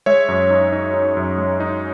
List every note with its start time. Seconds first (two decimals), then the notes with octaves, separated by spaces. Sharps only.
0.06 G#3 C#5 E5
0.29 F#2
0.51 D#4
0.72 D#4
0.94 D#4
1.17 F#2
1.38 G#3
1.60 D#4